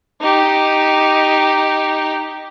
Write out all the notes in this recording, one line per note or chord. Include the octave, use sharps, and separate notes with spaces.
D#4 G4